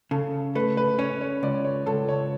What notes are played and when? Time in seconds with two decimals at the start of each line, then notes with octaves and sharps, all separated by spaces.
0.11 C#3 A4
0.55 A3 B4
0.77 B4
0.99 C#4 C#5
1.21 C#5
1.43 C#2 D5
1.65 C#5
1.86 C#2 A4
2.09 C#5